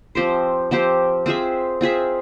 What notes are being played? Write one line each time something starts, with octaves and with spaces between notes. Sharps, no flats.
F3 C4 G4 C5
F3 C4 G4 C5
C4 F4 G#4 E5
C4 F4 G#4 E5